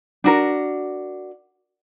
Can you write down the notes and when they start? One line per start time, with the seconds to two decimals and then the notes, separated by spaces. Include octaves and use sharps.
0.24 D4 F#4 A#4